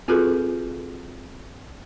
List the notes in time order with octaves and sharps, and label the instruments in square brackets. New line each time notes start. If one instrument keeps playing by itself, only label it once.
[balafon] C4 F4 F#4 G#4 A4 B4